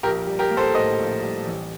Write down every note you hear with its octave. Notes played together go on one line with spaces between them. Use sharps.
A#1 G4 A#4
G3
G4 A#4
A#3
A4 C5
A2 C5 D#5
A#1
G3
A1